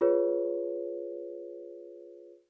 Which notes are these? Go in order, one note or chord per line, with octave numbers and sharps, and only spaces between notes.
F4 G#4 B4 C#5